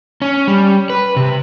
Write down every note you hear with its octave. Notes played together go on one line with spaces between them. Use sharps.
C#4
G3
B4
C3